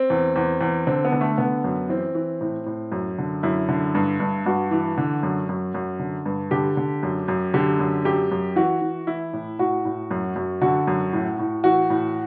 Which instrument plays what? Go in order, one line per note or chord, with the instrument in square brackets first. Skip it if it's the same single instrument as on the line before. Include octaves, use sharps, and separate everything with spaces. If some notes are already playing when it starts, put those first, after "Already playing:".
Already playing: [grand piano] C4
E2
E2
E2
D3 C4
B3
D3
A3
D3 B3
F#2
E3 C4
E3
A2
A2
F#2
D3
F#2 E4
D3
G2
G2
G2 F#4
E3
D3
F#2
F#2
F#2
D3
G2
D3 G4
D3
F#2
F#2
D3 G4
F#2
F#2 G4
F#2
E3 F#4
E3
E3 E4
A2
A2 F#4
A2
F#2
F#2
D3 F#4
F#2
A2
A2
E3 F#4
A2